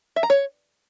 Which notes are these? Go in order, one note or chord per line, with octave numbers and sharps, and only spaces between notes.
E5
A#5
C#5